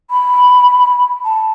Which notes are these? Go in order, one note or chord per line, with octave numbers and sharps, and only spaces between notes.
B5
A5